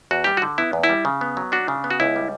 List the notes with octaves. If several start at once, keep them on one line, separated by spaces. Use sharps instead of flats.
E2 F#4
G3 G4
F#4
D3
B3 E4
E2
E4
G3
C#3
B3
F#3
D4 F#4
C#3
B3
F#4
C#2 E4
G3